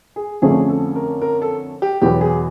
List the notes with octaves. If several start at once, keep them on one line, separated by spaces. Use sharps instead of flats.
G#4
F2 D3 F3 A3 C#4 G#4
A4
A#4
A#4
A4
G4
E2 B2 F#3 B3 G4
G#4